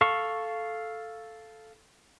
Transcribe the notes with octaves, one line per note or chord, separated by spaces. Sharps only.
A4 F5 C#6